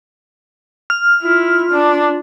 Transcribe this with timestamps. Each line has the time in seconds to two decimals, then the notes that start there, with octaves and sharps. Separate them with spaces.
0.90 F6
1.22 E4 F4
1.71 D4